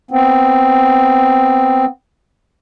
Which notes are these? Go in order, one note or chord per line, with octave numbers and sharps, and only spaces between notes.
B3 C4